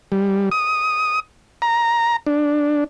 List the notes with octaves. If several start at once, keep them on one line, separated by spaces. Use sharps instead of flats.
G3
D#6
A#5
D4